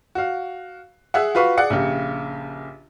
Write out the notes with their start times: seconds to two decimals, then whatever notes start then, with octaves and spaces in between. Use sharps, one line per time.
0.15 F#4 F5
1.14 G#4 E5 F#5
1.35 F4 F#4 B4 F5 C#6
1.58 G#4 D5 F#5 C#7
1.70 A#1 C#3 G4